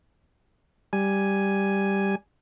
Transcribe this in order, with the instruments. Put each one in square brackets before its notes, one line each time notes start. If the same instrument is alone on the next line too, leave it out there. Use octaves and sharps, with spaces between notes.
[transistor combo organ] G3 G#5